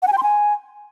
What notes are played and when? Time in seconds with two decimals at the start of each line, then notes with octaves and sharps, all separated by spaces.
0.02 F#5
0.08 G#5
0.13 G5
0.18 C6
0.23 G#5